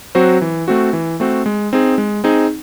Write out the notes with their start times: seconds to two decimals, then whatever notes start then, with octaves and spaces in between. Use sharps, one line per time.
0.15 F#3 C4 F#4 C5
0.42 E3
0.68 A3 C4 F#4
0.93 E3
1.20 A3 C4 F#4
1.46 G#3
1.73 C4 D#4 G#4
1.98 G#3
2.24 C4 D#4 G#4